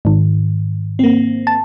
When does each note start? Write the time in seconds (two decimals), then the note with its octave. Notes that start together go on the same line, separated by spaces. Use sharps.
0.05 G#2 D#3
0.99 A#3 C4
1.47 A5